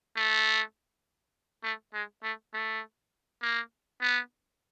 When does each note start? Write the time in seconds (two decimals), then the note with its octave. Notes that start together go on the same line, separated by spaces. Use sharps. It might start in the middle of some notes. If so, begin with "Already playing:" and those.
0.17 A3
1.64 A3
1.94 G#3
2.23 A3
2.54 A3
3.42 A#3
4.01 B3